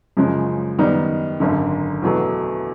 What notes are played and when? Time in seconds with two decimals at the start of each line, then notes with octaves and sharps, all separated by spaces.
0.17 F#2 C#3 F3 G#3 C#4
0.79 F#2 D#3 G3 B3 D#4
1.40 G#1 F#2 D3
2.02 E2 B2 F#3 A3